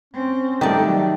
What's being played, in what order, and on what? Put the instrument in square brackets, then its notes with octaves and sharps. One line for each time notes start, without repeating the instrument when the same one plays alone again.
[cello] C4 [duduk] C#4
[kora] D#3 A3 [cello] F#3 [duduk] G3 [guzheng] G4 D5